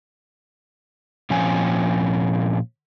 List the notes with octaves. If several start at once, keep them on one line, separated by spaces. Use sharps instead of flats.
A#2 F3 C4 C#4 G#5